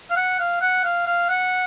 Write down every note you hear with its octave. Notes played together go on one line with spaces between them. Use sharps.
F5
F#5
F5
F#5
F5
F5
F#5